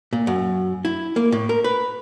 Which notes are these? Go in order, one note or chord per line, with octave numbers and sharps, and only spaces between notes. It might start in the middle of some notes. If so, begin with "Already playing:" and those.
A#2
F#2
E4
A#3
A2
A#4
B4